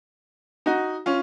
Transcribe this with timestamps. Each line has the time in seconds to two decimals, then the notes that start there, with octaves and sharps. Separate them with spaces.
0.66 D#4 F#4
1.06 C#4 F4